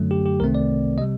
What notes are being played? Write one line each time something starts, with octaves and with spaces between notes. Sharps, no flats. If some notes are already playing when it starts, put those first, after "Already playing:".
Already playing: F#2 D3 F#3 A3
G4
G4
C2 C3 D#3 A3 C4 A#4
D5
C3 G3 D#5